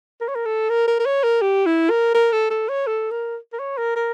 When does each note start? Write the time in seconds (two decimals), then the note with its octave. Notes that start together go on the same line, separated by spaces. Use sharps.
0.21 A#4
0.28 C#5
0.35 A#4
0.45 A4
0.69 A#4
0.87 A#4
1.00 A#4
1.06 C#5
1.24 A#4
1.42 G4
1.66 E4
1.90 A#4
2.15 A#4
2.32 A4
2.50 A4
2.69 C#5
2.87 A4
3.11 A#4
3.53 A#4
3.59 C#5
3.77 A#4
3.96 A#4